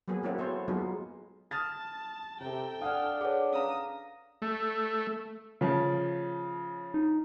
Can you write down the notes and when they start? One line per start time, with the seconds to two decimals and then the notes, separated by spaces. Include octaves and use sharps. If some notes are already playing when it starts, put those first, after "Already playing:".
0.08 F#3 A#3 B3 G#4
0.23 G#3 A#3 C4 C#4 E4 F#4
0.38 B3 A4 C5 C#5
0.68 F#3 G#3 A#3 B3 D#4 F4
1.51 A5 D#6 F6 A6
2.41 C3 A4 G5 A#5
2.82 D4 F5 F#5 G#5 D#6 F6
3.21 G#4 B4 C#5 F#5 D6
3.53 C#4 F5 A#5 D#6
4.42 A3
5.61 C#3 F3 A3
6.94 D#4